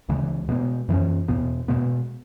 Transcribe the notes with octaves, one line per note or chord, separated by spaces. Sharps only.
C#2 C#3 E3 G#3
B2 G#3 B3
F#2 E3 C#4
E2 B2 B3
B2 G#3 B3